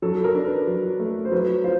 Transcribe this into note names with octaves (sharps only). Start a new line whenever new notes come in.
F#3 A4
A4
A#4
D4
B4
F#3
A3
C5
F#3 B4
F4 C5